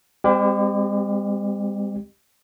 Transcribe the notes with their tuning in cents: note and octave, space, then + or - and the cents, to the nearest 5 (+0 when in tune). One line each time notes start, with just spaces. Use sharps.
G#3 -45 C4 -20 G4 +0